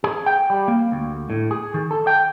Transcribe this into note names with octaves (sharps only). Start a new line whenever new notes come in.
G#4
G5
G3
A#3
D2
A2
G#4
D#3
A4
G5